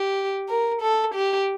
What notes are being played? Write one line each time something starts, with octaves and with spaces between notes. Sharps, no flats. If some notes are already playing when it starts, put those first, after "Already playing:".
Already playing: G4
A#4
A4
G4